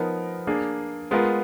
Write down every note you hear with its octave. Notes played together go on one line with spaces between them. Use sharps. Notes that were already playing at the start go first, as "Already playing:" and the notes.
Already playing: F3 B3 D#4 A#4
A#3 D4 G#4
G#3 B3 F4 A#4